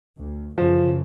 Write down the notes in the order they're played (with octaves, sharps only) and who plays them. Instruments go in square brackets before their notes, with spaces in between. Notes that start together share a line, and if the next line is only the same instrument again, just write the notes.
[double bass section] D2
[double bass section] F#2 C#3 E3 [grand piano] F3